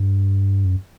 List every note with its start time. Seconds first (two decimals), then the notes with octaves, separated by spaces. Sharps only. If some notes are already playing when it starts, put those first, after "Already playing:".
Already playing: G2
0.65 F#2